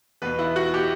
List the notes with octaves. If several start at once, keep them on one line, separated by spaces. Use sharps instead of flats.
E2 B2 B4
E4
F#4
B2 G4